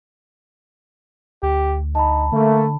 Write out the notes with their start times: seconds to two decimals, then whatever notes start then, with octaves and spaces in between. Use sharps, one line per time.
1.43 D2 G4
1.95 D#4 A5 B5
2.32 D3 A3 A#3